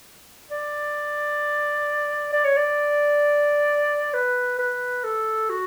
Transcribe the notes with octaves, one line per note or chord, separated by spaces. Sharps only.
D5
D5
C#5
D5
B4
B4
A4
F#4